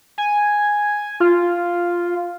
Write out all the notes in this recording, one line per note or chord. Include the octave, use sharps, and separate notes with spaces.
G#5
F4